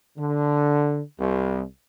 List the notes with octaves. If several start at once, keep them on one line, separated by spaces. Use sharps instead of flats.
D3
C2